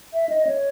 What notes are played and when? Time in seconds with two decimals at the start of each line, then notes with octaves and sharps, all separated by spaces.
0.14 E5
0.29 D#5
0.47 C#5